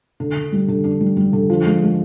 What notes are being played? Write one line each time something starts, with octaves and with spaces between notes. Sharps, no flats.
D3
D3
G3
D3
D4
G3
G3
D3
F3
G#3
G#3